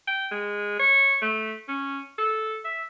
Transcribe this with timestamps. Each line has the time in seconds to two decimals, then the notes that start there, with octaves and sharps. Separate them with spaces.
0.07 G5
0.31 G#3
0.79 C#5
1.22 A3
1.69 C#4
2.18 A4
2.65 E5